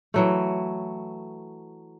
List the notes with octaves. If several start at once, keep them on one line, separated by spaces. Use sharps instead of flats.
E3 F#3 A3